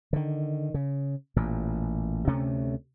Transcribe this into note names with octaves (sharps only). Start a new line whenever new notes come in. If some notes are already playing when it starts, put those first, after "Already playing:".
D3 D#3
C#3
A1 A#2
D2 C3 A3 C#4